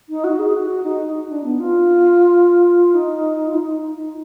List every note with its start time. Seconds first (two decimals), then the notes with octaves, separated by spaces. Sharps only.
0.09 D#4
0.24 F#4
0.39 G#4
0.54 F#4
0.84 D#4
1.14 D#4
1.29 D4
1.44 B3
1.60 F4
2.94 D#4
3.48 F4
3.54 D#4
3.85 D#4